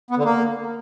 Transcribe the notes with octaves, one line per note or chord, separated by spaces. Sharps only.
B3
D3
A#3